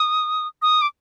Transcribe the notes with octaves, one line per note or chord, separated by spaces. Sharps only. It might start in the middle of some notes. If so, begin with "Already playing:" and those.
Already playing: D#6
D#6
D6